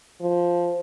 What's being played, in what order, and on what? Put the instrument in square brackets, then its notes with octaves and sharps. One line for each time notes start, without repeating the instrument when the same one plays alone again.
[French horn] F3